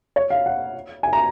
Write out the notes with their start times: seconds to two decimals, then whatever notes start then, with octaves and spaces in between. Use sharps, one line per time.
0.16 C#5
0.30 F5
0.46 F#5
1.03 G#5
1.13 A#5